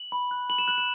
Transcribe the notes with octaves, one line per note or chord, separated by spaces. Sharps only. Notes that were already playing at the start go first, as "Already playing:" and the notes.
Already playing: F#7
B5
F#6
B5 F#7
E7
F#6 F#7
E7